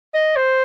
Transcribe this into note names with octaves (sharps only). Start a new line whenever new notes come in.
D#5
C5